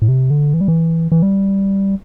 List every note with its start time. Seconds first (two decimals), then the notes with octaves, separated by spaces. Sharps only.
0.02 A2
0.08 C3
0.30 D3
0.54 E3
0.61 G3
0.68 E3
1.12 E3
1.22 G3